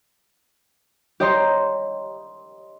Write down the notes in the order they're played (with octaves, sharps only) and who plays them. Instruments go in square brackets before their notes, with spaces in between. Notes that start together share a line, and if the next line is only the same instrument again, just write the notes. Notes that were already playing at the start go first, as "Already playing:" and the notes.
[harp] G4 C#5 D#5 A#5 C6